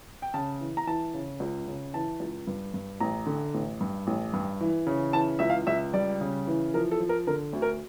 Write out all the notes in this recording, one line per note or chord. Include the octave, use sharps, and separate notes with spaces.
G5
C#3 A5
E3
A#5
E3 A5
C#3
C#2
C#3
E3 A5
C#2
G2
G2
A1 A#5
D3
A1
G2
A1
G2
E3
C#3
E3 A5
C#2 E5
F5
C#2 E5
G3 D5
C#3
E3
F3 A#4
A4
F3
A#4
D3 A#4
D2
A#4